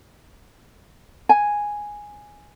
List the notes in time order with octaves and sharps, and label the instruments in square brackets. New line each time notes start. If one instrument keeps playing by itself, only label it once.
[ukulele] G#5